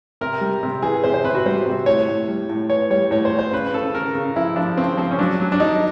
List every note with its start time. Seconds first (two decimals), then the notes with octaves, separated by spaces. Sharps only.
0.21 C3 A#4
0.41 G3
0.63 C3
0.82 E3 G#4
1.04 C3 C5
1.14 C5
1.24 C3 B4
1.35 F#4
1.46 G3 C5
1.66 C3
1.86 A2 C#5
2.08 A2
2.28 G3
2.49 A2
2.69 E3 C#5
2.90 G3 C#5
3.11 A2 C#5
3.25 C5
3.32 E3
3.39 C5
3.52 C#3 B4
3.73 C#3 A4
3.94 C#3 A#4
4.15 C#3
4.36 F3 E4
4.56 F3 D4
4.77 C#3 C4
4.97 F3 C4
5.11 C#4
5.19 F#3 D4
5.40 F#3
5.52 D4
5.60 F#3 D#4